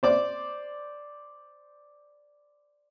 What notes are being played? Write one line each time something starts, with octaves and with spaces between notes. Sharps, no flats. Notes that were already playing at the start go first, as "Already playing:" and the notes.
C5 D5 D6